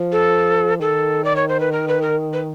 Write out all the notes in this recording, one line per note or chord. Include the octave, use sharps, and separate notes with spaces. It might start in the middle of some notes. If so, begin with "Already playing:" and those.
Already playing: F3
A4
D#3 A4
D5
C#5
C5
B4
A#4
B4
A#4
B4